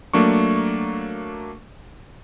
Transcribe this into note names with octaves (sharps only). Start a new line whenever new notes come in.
F#3 A3 A#3 D4 C#6